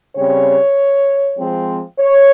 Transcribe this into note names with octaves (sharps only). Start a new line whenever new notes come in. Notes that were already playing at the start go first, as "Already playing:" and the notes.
C#3 G3 C4 C#5
F3 G#3 C4
C#5